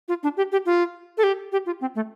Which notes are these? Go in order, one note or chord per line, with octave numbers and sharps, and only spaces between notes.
F4
D4
G4
G4
F4
A4
G4
G4
F4
C4
A3